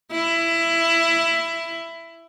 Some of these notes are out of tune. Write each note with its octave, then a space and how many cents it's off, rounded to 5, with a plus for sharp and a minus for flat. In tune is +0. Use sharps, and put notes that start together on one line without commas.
E4 +15